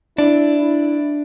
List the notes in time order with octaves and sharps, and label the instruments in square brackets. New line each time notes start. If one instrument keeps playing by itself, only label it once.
[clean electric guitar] D4 [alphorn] E4
[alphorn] E4